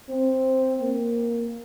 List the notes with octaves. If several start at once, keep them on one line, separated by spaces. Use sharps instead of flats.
C4
A#3